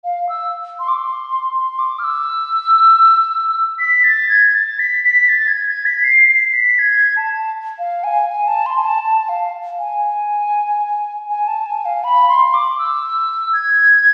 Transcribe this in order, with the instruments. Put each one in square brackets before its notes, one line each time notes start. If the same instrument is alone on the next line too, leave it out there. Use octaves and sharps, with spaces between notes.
[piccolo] F5
E6
C6
D6
C6
C6
D6
F6
E6
B6
A6
G#6
A6
B6
B6
A6
G#6
G#6
B6
C7
C7
B6
G#6
A5
F5
G#5
G#5
A5
C6
G#5
A5
A5
F5
G#5
G#5
A5
G#5
F5
B5
C6
D6
E6
G#6